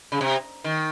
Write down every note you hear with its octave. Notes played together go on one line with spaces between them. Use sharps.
C#3
C3
D#3